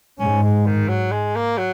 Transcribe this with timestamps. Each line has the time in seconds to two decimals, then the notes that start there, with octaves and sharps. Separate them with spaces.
0.20 G#2 C#4
0.43 G#3
0.66 D#3
0.88 F#3
1.11 G#3
1.35 A#3
1.58 F#3